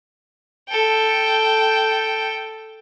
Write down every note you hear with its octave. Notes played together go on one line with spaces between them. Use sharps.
A4 G5